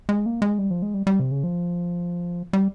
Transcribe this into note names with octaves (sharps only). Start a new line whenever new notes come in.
G#3
A#3
G#3
G3
F3
G#3
G3
G3
C3
C#3
F3
G3